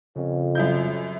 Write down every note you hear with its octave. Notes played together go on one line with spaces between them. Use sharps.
F2 C#3
F#2 E4 G6